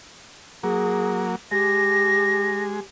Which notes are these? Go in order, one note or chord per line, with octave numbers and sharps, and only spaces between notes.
F#3 A#3 G#4
G#3 G4 A#6